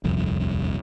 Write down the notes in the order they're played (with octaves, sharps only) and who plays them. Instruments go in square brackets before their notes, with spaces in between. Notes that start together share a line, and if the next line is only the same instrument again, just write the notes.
[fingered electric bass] D#1 C2 F2